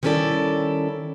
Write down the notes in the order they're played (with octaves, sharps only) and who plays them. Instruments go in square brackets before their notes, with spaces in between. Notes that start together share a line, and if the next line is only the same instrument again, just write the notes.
[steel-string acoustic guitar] D#3 G3 C#4 E4 A4 D5